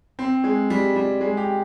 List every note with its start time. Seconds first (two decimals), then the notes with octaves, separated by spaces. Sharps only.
0.19 C4
0.44 G#3
0.70 G3
0.96 G3
1.21 G#3
1.37 G4